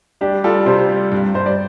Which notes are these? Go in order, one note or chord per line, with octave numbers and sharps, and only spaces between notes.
G3 D4 G4
G3 F4 A4
C3 G4 C5
G3
G2
G2 C5
D5